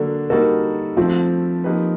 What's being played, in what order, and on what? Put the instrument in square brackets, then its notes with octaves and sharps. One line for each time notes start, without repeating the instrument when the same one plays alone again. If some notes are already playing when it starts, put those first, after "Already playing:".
Already playing: [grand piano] D3 F#3 A#3 D4 [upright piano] A4
[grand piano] G3 A#3 D#4 F#4 A4 [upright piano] A#4
[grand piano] F3 A3 C4 [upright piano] F4
[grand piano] F3 A#3 D#4 G4 B4